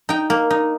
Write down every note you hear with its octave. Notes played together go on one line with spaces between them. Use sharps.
D#4 G5
A#3
D#4